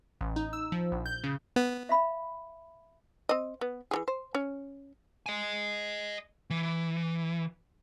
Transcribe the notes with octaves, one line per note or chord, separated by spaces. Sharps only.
A1
D#4
E6
F3
A#1
G6
C#3
B3
E5 F5 B5
C4 D#5
B3
E3 F#3 G#4
C5
C#4
D#5 G#5
E3